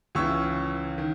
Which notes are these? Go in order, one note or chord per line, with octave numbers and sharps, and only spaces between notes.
C#2 C#3 E3 C#6 E6
D#3